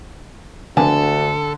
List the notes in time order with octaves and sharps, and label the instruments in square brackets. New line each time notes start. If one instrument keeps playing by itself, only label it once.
[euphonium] D2 [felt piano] D3 [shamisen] A#3 B3 G#4 [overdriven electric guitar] A4